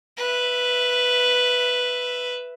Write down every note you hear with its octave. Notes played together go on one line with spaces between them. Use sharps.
B4 E5